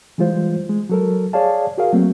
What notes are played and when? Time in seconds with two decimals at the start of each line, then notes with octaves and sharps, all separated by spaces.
0.18 E3 G3 G#3 F4 C5
0.69 G#3
0.89 F#3 A4 A#4
1.33 G#4 C#5 D5 F5 A5
1.78 F#4 G#4 A#4 F5
1.93 F#3 A3 A#3 C4